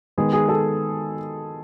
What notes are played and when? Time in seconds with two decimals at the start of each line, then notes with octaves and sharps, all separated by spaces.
0.18 D#3 G#3 B3 G#4
0.33 G#4
0.49 A4